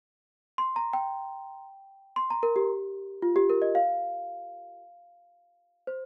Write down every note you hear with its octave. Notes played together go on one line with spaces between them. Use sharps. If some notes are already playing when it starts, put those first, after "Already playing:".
C6
A#5
G5
C6
A#5
A#4
G4
F4
G4
A#4
D#5
F5
C5